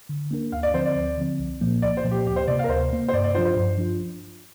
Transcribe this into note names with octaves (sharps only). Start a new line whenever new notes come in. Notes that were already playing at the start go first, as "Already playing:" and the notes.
D3
A#3 D4 A#4
D2 F5
D5
D3 F3 C4 C5
D5
D2
D3 F3 C4
C2
A#2 F3 A#3
C2 D5
C5
A#2 F3 A#3
G4
D2 G4
C5
C3 A#3 D5
F5
A#4
D2 C5
C3 A#3
C5
G2 D5
D5
F3 D4 F4 C5
C5
G2
F3 D4 F4